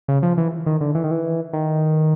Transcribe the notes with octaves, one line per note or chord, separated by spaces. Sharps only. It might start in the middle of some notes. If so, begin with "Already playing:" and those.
C#3
F3
E3
D#3
D3
E3
D#3
E3
D#3